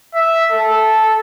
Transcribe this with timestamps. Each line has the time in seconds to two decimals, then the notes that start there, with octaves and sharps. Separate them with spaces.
0.15 E5
0.52 A4